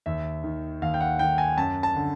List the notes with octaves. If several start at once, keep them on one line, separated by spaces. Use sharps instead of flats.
D#2 E5
D#3
D#2 F5
G5
F#5
D#3 G5
G#5
F#2 A5
A5
D3